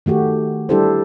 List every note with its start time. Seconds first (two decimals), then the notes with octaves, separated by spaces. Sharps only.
0.06 D#3 A3 F#4 G4
0.69 G3 D4 E4 G4 A4 C5